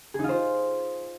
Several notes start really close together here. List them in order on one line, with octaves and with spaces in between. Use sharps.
G#4 D#4 F4 C5